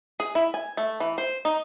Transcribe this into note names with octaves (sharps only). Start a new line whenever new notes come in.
G#4
E4
G#5
A3
E3
C5
D#4